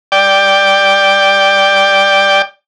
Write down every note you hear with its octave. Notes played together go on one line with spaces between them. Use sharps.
D5 G5